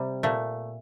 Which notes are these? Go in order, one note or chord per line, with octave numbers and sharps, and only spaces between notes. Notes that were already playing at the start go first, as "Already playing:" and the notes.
Already playing: C3 G3
A#2 A3